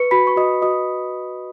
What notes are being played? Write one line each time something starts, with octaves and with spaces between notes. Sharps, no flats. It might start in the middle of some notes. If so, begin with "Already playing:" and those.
Already playing: B4 C#6 C#7
F#4 B5 B6
C#6
F#4 D#5 D#6
F#4 D#5 D#6